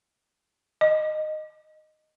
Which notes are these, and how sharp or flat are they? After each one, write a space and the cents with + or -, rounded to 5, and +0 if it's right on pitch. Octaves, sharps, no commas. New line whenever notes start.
D#5 -10